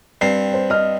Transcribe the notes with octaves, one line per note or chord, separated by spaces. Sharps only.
G2 C4 C7
C5
D#5 F6